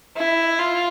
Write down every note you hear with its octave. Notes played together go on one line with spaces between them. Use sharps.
E4
F4